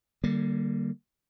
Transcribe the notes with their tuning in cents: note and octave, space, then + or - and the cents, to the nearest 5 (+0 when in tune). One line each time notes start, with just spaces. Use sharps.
D3 +25 G3 -15 A#3 +0